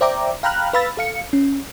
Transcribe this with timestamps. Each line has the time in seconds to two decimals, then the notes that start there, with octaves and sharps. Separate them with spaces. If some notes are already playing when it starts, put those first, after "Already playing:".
0.01 C5 D5 E5 G5 A#5 D6
0.43 F5 G5 A#5 B5 F6 F#6
0.73 B4 F5 B5 E6 A6
0.97 A4 F5 C#7
1.33 C#4